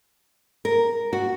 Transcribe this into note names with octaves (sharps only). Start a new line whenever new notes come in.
A#4
F#4